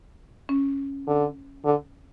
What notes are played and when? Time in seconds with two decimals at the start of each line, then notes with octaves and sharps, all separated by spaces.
0.49 C#4
1.07 D3
1.65 D3